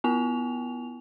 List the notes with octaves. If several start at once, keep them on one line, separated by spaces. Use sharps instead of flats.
B3 E4 G5 F7